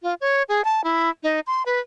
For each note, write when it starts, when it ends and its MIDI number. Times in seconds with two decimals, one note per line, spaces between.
0.03 0.14 65
0.21 0.43 73
0.49 0.61 68
0.65 0.84 81
0.84 1.10 64
1.23 1.40 63
1.47 1.63 84
1.66 1.79 71